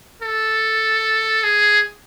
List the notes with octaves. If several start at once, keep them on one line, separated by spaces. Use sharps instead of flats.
A4
G#4